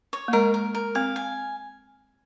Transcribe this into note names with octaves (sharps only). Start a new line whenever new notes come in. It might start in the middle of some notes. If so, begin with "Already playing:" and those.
C#5
A#3
G#3 A#4
A#4
A#4
C4 F5
G#5